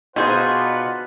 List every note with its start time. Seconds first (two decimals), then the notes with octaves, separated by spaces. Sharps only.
0.16 B2 D4 D#4 F4 G#4 B4 C5 F#5